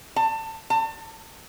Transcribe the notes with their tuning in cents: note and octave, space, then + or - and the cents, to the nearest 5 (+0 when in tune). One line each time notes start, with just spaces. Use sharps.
A5 +25
A5 +35